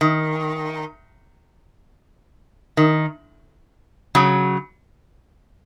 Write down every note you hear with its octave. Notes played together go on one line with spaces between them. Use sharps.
D#3
D#3
C#3 F#3